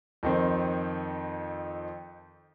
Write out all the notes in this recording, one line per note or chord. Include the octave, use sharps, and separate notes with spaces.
F2 D#3 C4